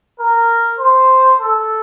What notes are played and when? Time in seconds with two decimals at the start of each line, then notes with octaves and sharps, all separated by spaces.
0.19 A#4
0.79 C5
1.39 A4